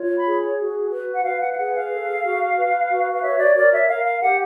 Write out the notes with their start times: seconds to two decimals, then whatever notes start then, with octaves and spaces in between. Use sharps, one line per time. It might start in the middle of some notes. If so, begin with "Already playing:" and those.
Already playing: F4 C#5
0.15 B5
0.26 G#4
0.59 F#4
0.92 B4
1.14 F#5
1.25 B4 F5
1.41 F#5
1.52 F5
1.57 G#4 F#5
1.74 F5
1.91 A4
2.24 F#4
2.57 B4
2.90 F#4
3.13 F5
3.22 C#5 E5
3.39 D5
3.56 A#4 D5
3.72 E5
3.88 A#4 F5
4.05 F5
4.21 G4 F#5